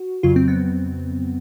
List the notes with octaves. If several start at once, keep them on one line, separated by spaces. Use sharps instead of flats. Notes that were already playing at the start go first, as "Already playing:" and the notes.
Already playing: F#4
F2 C#3 F#3 F4
C4
B3